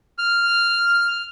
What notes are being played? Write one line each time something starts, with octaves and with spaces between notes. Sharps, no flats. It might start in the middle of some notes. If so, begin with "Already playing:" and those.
F6